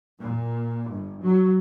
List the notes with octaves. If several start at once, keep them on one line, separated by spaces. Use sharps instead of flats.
A#2
G1
F#3